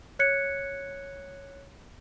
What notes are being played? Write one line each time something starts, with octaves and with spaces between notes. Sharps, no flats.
C#5 F#6 G#6 C#7